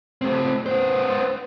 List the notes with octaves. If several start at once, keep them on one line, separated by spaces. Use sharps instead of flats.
A3 C4
B3 C5